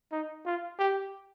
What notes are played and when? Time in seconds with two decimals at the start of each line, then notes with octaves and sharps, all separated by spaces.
0.12 D#4
0.45 F4
0.79 G4